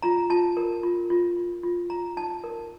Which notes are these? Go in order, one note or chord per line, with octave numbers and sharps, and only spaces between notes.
F4 A#5
F4 A5
A#4
F4
F4
F4
F4
F4 A#5
D#4 A5
A#4